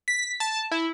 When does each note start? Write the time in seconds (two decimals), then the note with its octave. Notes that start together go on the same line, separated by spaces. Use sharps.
0.08 B6
0.40 A5
0.71 E4